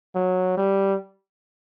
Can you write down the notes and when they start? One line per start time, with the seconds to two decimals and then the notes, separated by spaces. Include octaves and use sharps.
0.15 F#3
0.57 G3